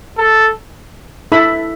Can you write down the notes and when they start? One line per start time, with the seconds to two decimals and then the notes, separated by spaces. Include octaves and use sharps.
0.18 A4
1.32 E4 A4 E5 B5